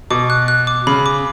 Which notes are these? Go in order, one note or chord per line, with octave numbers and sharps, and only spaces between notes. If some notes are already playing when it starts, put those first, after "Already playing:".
B2 D6
F#6
F#6
D6
C#3 B5
D6